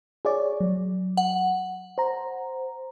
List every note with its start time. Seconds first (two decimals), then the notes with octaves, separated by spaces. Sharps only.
0.25 G#4 C#5 D5
0.60 F#3
1.17 F#5
1.98 C5 A#5